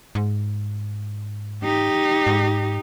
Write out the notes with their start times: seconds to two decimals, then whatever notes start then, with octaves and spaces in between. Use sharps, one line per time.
0.15 G#2
1.64 D#4 G4
2.27 G#2